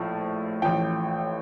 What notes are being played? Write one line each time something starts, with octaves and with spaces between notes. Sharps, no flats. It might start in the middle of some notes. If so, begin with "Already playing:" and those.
Already playing: A#1 A2 F3
A1 A2 F3 G5